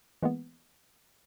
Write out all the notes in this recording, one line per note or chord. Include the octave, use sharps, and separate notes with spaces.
E3 G#3 A#3 B3